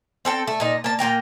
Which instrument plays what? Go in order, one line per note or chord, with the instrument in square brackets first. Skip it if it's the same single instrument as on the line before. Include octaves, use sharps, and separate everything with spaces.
[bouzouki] C4 A4 G5
A3 E5
A#2 D#4
A#3 A5
A#2 A#3 G5 A#5